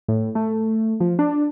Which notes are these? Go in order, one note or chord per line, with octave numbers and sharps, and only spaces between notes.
A2
A3
F3
D4